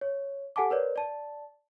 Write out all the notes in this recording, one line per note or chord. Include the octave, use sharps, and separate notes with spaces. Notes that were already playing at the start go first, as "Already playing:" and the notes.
C#5
G4 A4 F#5 G#5 A5 D6
A#4 B4 C#5 D5
D5 A5